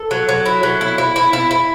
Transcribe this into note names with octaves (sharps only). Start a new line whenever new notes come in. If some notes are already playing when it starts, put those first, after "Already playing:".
Already playing: A4
F#3
F#3
E4
F#3
E4
E4
E4
E4
E4